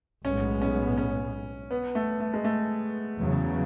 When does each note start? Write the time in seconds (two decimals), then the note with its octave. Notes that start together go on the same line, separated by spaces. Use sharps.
0.24 B1 A2 G#3 B3 C#4
0.62 C#4
0.98 C#4
1.71 B3
1.95 A3
2.20 A3
2.34 G#3
2.44 A3
3.17 E2 C#3 F#3